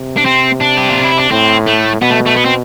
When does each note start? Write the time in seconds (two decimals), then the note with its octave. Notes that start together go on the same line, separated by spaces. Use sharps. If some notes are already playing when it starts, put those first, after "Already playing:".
Already playing: C3
0.17 D4
0.25 C4
0.60 D4
0.77 G4
0.90 F4
1.03 E4
1.17 D4
1.31 A2 C4
1.66 A3
2.01 B2 B3
2.10 A3
2.26 A3
2.36 B3
2.45 C4